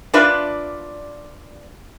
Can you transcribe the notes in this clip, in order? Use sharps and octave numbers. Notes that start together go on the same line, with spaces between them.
D4 F4 B4 D5 E5